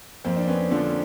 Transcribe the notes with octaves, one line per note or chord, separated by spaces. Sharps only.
F2 A#3 C4
D4
B3 C#4
D3 F3 C4 D4